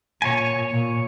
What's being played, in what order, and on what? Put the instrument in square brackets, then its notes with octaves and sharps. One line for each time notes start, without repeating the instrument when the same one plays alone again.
[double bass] A#2 [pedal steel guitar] C#5 G#5
[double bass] A#2